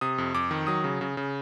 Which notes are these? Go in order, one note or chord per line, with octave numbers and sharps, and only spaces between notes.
C3 D#6
F2
F2 D6
D#3
F#3 D#6
C#3
C#3
C#3